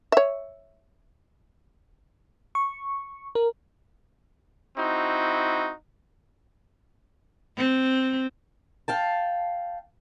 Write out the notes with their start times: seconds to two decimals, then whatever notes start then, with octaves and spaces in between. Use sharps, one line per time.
0.12 C#5 E5
2.55 C#6
3.35 A#4
4.77 C4 D#4 E4 F#4
7.58 C4
8.88 F5 G5 A5